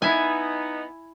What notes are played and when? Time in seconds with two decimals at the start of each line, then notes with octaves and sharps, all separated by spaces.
0.02 B3 D#4 E4 E5 G#5